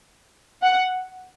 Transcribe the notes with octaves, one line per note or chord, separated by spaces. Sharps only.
F#5